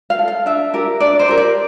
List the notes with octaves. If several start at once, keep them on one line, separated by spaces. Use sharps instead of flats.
F5
A4
F5
D4 E5
G4 A#4
D4 D5
C5
G4 A#4
D5